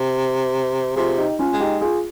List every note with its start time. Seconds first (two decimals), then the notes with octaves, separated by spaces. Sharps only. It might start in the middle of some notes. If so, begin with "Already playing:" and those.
Already playing: C3
0.96 C3 F4 G#4
1.18 D#4 G4
1.39 C#4 F4
1.53 G#3
1.60 D#4 G4
1.81 F4 G#4